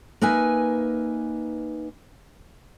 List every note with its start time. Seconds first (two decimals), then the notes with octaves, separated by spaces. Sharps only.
0.22 A#3 D#4 B4 E5 G#5